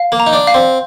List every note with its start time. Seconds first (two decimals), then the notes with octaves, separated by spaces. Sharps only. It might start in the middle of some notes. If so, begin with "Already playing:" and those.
Already playing: F5
0.12 A#3
0.20 A#5
0.26 D#4
0.33 D4
0.47 F5
0.54 C4